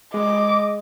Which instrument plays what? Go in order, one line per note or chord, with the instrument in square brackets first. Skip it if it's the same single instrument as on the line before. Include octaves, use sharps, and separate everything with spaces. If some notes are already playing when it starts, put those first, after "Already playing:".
[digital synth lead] G#3 [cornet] D#5 [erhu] D6